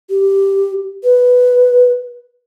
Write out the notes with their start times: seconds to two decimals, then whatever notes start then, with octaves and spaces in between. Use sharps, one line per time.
0.10 G4
1.04 B4